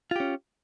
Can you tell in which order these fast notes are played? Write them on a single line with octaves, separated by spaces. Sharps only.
F4 G4 C#4